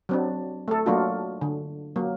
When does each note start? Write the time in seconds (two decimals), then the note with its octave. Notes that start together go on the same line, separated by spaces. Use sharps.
0.09 F#3 C4 D4
0.68 A3 A4
0.86 F#3 A3 A#3 D4 F4 F#4
1.41 D3
1.96 F#3 A#3